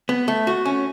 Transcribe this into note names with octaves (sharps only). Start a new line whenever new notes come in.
B3
A3
F#4
C#4